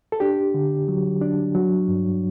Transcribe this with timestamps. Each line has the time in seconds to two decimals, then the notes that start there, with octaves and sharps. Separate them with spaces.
0.12 A4
0.20 D4 G4
0.54 D3
0.88 F#3
1.22 D4
1.55 F#3
1.88 G2